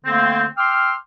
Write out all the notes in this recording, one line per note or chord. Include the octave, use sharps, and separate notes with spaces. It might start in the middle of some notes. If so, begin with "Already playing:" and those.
D3 A3 A#3 C4
G5 C6 D6 E6 F6